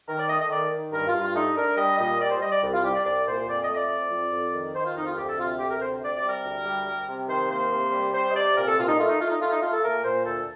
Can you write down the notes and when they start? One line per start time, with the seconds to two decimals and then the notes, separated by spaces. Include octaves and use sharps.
0.07 D#3 A#4
0.18 D5
0.28 A3 D#5
0.39 D#5
0.50 D#3 D5
0.71 D#3
0.92 G2 A#4
1.06 F4
1.13 G2
1.21 F4
1.35 A3 D#4
1.56 D4 A#4
1.77 G3 D#5
1.98 A#2 D#5
2.19 G3 D5
2.30 C5
2.40 G3 D#5
2.51 D5
2.62 C2
2.73 F4
2.83 G3 G4
2.94 D5
3.04 C2 D5
3.26 A#2 C5
3.46 F2 D5
3.61 D#5
3.68 A3
3.75 D5
3.89 F2
4.10 F2
4.31 F2
4.52 D#3
4.74 D#3 C5
4.80 D#4
4.84 F4
4.95 F2 D#4
5.06 F4
5.16 D2 G4
5.27 A4
5.37 C3 F4
5.58 D2 G4
5.69 A#4
5.79 C3 C5
6.01 C3 D5
6.15 D5
6.23 G3
6.29 A#4
6.44 D2
6.65 G3
6.86 G3
7.07 C3
7.28 D#3 C5
7.49 A#3 C5
7.71 C3
7.92 G3
8.13 C3 C5
8.29 D#5
8.34 C3 D5
8.55 A#2 A#4
8.66 A4
8.77 A#2 F4
8.87 D#4
8.98 A3 F4
9.08 D#4
9.19 A3 F4
9.29 D#4
9.40 A3 F4
9.51 D#4
9.61 A3 F4
9.72 A4
9.82 A#2 A#4
10.04 A#2 C5
10.25 D2 A4